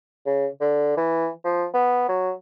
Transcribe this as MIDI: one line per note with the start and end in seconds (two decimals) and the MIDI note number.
0.26 0.47 49
0.61 0.94 50
0.97 1.30 52
1.44 1.66 53
1.74 2.07 59
2.08 2.31 54